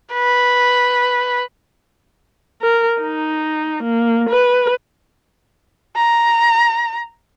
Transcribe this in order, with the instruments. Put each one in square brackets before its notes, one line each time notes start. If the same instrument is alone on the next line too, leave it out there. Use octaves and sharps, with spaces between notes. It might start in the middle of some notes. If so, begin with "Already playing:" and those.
[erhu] B4
[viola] A#4
D#4
A#3
B4
[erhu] A#5